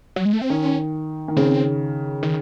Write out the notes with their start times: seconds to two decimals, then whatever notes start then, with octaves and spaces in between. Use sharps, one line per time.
0.16 F#3
0.25 G#3
0.33 A3
0.42 C4
0.50 D#3 C#4
1.28 D#3
1.37 C#3 C4
2.23 D#3